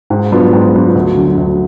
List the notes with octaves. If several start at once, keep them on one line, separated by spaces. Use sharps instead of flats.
G#2
F#3 B3 D4 F4
G#2
F#3 B3 D4 F4
D2
D3 F#3
D2